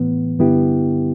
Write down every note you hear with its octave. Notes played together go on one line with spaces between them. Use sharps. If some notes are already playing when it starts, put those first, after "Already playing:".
Already playing: A2 E3 B3
G2 D3 B3 E4 G4